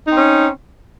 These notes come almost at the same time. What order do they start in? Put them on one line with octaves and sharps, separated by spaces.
D#4 C4 C#4